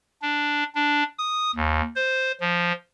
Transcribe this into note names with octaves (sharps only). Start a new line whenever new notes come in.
D4
D4
D#6
D#2
C5
F3